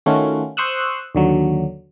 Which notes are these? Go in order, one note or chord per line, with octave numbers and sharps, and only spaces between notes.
D#3 A3 C#4 F4 F#4
C5 C6 C#6 D#6 E6 F#6
D#2 D3 F#3